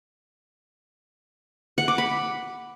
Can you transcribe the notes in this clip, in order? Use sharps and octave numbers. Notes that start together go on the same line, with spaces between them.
F#5
D6
B5